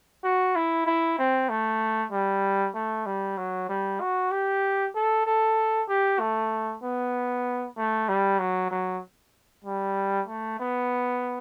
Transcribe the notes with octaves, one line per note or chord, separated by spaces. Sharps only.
F#4
E4
E4
C4
A3
G3
A3
G3
F#3
G3
F#4
G4
A4
A4
G4
A3
B3
A3
G3
F#3
F#3
G3
A3
B3